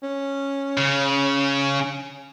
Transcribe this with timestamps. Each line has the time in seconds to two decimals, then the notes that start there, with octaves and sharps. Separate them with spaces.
0.03 C#4
0.78 C#3